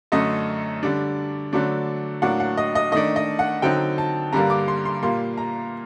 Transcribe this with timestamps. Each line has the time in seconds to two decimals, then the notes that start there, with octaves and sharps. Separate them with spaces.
0.12 F#2 D3 A3 D#5
0.83 D3 G3 D4
1.53 D3 F#3 A3 D4
2.22 A2 F#3 A#3 D4 F#5
2.40 F#5
2.57 D#5
2.75 D#5
2.92 D#3 A3 D4 D#5
3.16 D#5
3.39 F#5
3.62 D3 F#3 C4 D#4 G5
3.98 A5
4.33 G2 D3 G3 A#3 A#5
4.50 D6
4.68 C6
4.85 C6
5.02 A#2 G3 A#3 C6
5.37 A#5